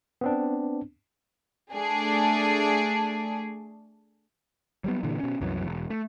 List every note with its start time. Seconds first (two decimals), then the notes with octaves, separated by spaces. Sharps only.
0.21 B3 C4 D4
1.74 A3 D4 G#4
4.84 F#3 G3 B3
5.03 G2 A#2 D3 E3
5.20 B2 C#4
5.41 C2 F#2 E3 F#3
5.64 E1
5.90 A3